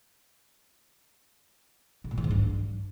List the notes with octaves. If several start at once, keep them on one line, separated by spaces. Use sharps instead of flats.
A2
A#2
E3
G#2
G2